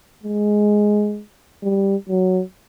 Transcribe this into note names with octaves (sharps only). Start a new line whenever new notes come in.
G#3
G3
F#3